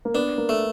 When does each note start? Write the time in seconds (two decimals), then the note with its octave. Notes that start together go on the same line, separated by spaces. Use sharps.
0.05 A#3
0.14 B3 D4
0.38 A#3
0.49 A3